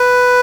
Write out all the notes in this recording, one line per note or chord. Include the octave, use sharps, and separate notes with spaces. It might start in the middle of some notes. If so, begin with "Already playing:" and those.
Already playing: B4